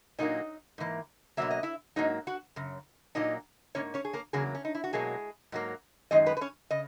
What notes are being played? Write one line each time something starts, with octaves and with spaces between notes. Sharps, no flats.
A#2 F#3 A#3 D#4 D#5
G#2 E3 A#3
B2 F#3 A#3 E5
D#5
E4 E5
G#2 F#3 A#3 D#4 D#5
F#4 F#5
F#2 C#3
A#2 F#3 A#3 D#4 D#5
G#2 E3 A#3 C#4 C#5
C#4 C#5
G#4
A#3 A#4
E2 C#3 F#3 A#3 G#4
C#4
D#4
E4
F#4
B2 F#3 G#3 A#3 G#4
G#2 F#3 A#3
F#2 D#3 G#3 D#4 D#5
B3 B4
B4
C#4 C#5
C#3 D#5